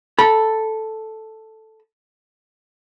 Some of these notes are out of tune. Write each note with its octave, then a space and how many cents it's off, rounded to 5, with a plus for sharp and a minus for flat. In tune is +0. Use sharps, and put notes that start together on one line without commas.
A4 +0 B5 -30